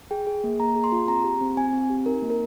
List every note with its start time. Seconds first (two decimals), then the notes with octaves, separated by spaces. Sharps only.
0.11 G#4 G5
0.27 G#4
0.44 A#3
0.60 A#3 A#5
0.76 G#4
0.84 C6
0.92 F4
1.08 C4 A#5
1.24 G4
1.41 C4
1.57 C4 G#5
1.73 C4
1.90 G4
2.06 D#4 A#4
2.22 A#3
2.30 A#4